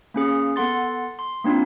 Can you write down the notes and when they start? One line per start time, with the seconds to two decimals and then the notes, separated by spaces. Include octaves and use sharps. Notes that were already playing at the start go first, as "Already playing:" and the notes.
0.14 A#3 C#4 G#4 F5
0.56 B3 A4 F#5 C6 A6
1.19 C6
1.44 A#3 C4 D4 D#4 F4